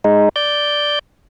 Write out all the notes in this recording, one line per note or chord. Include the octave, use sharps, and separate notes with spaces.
G#3 D#4
D5 G6